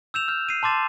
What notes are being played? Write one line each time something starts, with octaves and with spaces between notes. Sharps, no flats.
E6 G6 E7 F7
F6 G6
C7 D#7
A5 C6 D6 A6 E7